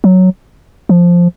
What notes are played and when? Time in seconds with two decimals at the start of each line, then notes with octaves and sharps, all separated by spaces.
0.04 F#3
0.89 F3